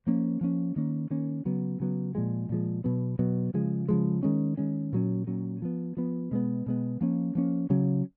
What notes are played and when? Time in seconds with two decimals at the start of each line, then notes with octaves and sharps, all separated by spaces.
0.07 F3 A#3 C#4
0.41 F3 A#3 C#4
0.76 D#3 A#3 C#4
1.10 D#3 A#3 C#4
1.45 C#3 F#3 B3
1.80 C#3 F#3 B3
2.15 A#2 F3 G#3
2.49 A#2 F3 G#3
2.84 B2 F#3 B3
3.19 B2 F#3 B3
3.54 C#3 F3 G#3
3.89 C#3 F3 G#3
4.23 D#3 G#3 C#4
4.57 D#3 G#3 C#4
4.93 A#2 F#3 C#4
5.27 A#2 F#3 C#4
5.62 F3 B3
5.97 F3 B3
6.31 B2 G#3 B3
6.66 B2 G#3 B3
7.01 F3 A#3 C#4
7.35 F3 A#3 C#4
7.70 C#3 F#3 C#4